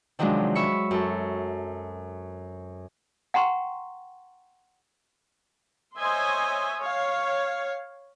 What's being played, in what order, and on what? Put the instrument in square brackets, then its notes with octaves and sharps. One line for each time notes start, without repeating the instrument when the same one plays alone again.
[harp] C3 D#3 F3 F#3 G#3 D4
E5 B5 C#6
F#2 A4
[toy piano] F#5 G5 A#5 C6 C#6
[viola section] C5 C#5 D#5 E5 G#5 C6
C#5 F5